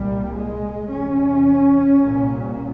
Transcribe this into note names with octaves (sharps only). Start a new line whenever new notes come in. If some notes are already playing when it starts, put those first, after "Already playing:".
Already playing: C2 A#2 G3
G#3
E2 C3 C#4
C2 A#2